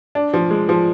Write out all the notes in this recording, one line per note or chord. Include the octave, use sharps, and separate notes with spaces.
D4
F3
G#3
F3